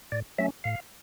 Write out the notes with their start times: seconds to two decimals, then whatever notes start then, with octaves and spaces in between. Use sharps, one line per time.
0.12 A2 D5
0.38 F#3 A3 C#4 E5
0.64 A2 F5